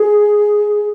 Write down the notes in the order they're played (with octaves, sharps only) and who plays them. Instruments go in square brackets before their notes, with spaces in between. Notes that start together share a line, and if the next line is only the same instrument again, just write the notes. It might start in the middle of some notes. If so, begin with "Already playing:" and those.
Already playing: [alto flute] G#4